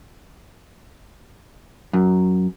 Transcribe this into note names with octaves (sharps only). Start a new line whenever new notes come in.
F#2